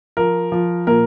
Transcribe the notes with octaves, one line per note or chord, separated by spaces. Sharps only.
F3 A#4
F3
A#2 A#4